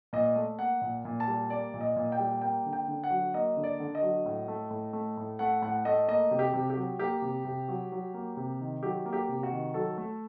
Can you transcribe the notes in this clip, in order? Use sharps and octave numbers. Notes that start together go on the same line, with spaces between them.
A#2 D#5
A3
A#3 F#5
A#2
A#2
A5
G3
A#3 D5
A#2
D#5
A#2
G5
G3
A#3 G5
D3
G5
D3
F#5
F#3
A#3 D#5
D3
D5
D3
D#5
F#3
A2
A3
A2
A3
A2
A3 F#5
A2 F#5
A3 D#5
A#3 D#5
C3
G4
C3
G4
F#3
A#3 G4
C3
C3
F#3
F#3
A#3
C3
D#3
F#3 G4
A#3
G4
C3
F#4
D#3
F#3 A4
A3